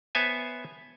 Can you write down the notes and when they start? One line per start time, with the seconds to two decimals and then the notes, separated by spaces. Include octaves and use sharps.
0.15 B3 C5 C#5 E5 G#5 A5